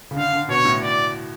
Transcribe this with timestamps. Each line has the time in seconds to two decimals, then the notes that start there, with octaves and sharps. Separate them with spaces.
0.11 C#3
0.16 D3 F5
0.33 D3
0.48 B2 C#5
0.65 A2
0.83 D5